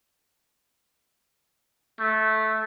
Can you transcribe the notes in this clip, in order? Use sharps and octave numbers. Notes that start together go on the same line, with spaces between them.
A3